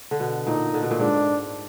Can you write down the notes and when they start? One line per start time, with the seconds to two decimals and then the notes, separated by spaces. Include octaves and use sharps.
0.11 D3
0.20 B2
0.47 A#2 D#4
0.74 D3
0.82 B2
0.91 A#2
0.99 G#2 D4